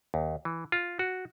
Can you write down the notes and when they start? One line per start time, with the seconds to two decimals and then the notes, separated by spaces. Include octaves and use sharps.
0.14 D#2
0.45 E3
0.72 F4
0.99 F#4